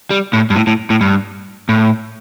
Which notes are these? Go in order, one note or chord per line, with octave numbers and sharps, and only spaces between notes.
G3
A2
G2
A2
A2
A2
G2
A2